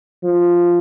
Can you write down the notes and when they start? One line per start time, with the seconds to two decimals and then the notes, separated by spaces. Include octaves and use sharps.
0.24 F3